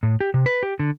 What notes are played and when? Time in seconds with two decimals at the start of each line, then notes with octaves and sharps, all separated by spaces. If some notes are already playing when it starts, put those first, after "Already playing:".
0.03 A2
0.21 G4
0.34 C3
0.46 B4
0.63 G4
0.80 D3